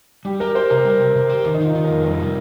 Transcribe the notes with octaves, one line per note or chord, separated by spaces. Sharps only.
G3 G4
G4 A#4
G4 C5
C3 A#4
G3
C3
C3
G4
D#3
D#4
D#3 F4
D#3
A#4
F2
G3 A#4
C3